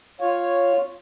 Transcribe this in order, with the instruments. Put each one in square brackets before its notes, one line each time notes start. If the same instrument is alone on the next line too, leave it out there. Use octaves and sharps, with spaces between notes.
[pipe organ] F4 [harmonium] C#5